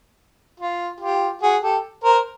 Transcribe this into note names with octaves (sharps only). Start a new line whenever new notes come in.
F4
F4 G4
F#4 G#4
G4 A4
A#4 C5